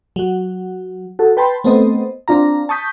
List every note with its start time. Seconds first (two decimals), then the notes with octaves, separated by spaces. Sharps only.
0.16 F#3 F#4
1.19 F#4 A4
1.37 B4 G5 A5 B5 C6
1.64 A3 B3 C4 A4 C5 D#5
2.28 C4 D4 F4 A#5
2.69 A5 C#6 D#6 G6 B6